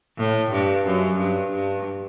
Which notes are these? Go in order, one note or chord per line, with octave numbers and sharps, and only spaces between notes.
A2
G2
F#2
G2
G2